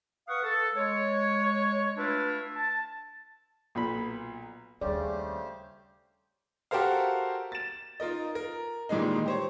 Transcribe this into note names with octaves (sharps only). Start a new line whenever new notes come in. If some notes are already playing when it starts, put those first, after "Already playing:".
B4 F5 F#5 C#6 D#6
A4
G#3 C#5
A3 D4 E4 F4 B4
A5
B1 A#2 B5
D#2 C#3 G3 A3 G4 C5 D5
F#4 G4 A4 A#4 C5 F5
A6 E7
D#4 F4 A#4 D#5
A#4
A#2 D#3 E3 G3 G#3 D#4
G4 C5 C#5